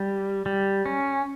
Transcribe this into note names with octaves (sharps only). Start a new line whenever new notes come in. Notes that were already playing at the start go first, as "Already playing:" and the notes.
Already playing: G3
G3
C#4